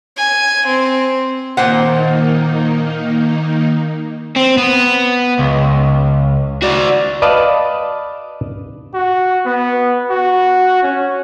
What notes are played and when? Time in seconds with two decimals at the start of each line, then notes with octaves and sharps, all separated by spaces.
0.17 G#5
0.67 C4
1.57 A#2 D#3 A#3 D#4 C5 F#5
4.36 C4
4.58 B3
5.39 C#2
6.62 F#4 D5
7.22 B4 D5 D#5 F5 A5
8.94 F#4
9.46 B3
10.10 F#4
10.83 C#4